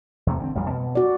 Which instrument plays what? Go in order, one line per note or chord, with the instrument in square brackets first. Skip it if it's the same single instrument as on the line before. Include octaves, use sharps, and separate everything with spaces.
[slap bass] E2 C3 A3
D3 B3 C4
A1 F2 G3
B2
[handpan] F#4 D5